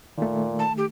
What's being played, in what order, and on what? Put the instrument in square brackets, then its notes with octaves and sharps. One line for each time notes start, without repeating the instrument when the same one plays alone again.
[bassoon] A#2 [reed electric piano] D#3 A3
[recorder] A5
G4